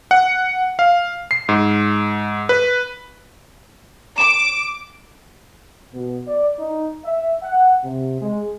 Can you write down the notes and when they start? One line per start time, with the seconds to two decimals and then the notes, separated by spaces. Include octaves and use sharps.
0.11 F#5
0.79 F5
1.31 C7
1.49 G#2
2.49 B4
4.18 D6 E7
5.93 B2
6.28 D5
6.59 D#4
7.05 E5
7.42 F#5
7.84 C3
8.21 G#3